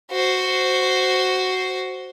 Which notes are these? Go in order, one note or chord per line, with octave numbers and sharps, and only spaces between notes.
F#4 C5